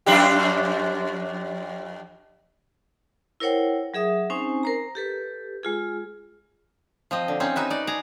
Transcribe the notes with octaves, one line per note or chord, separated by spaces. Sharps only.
F2 D4 G4
E4 A#4 C5 C#5 F#5 G5
F#3 G#4 E5 D#6
C4 C#4 D#4 C5 G#5
A#4 C5 A#5
G4 A4 B4
G#3 F4 G#4
F3 C4 D#5
D3
C4 C#4 D#4
D#4 F#4 B4 E5
D#4 D5
G#4 A5 A#5